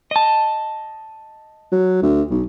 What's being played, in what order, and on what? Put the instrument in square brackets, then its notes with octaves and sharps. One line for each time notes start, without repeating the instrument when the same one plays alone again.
[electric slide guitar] D#5 A5
[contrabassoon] F#3
D2
B1